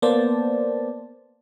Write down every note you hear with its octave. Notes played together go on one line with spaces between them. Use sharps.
A#3 B3 C5 D5 A5